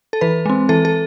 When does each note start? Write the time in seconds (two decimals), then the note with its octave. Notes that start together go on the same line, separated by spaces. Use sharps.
0.13 A4
0.21 E3 B4
0.46 G#3 C4
0.69 E3 A4
0.85 A4